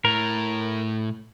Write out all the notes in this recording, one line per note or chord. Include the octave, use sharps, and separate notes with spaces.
A2 A#4